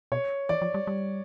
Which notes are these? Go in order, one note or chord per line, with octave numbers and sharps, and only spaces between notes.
B2 C#5
E3 D5
F3
G3
G3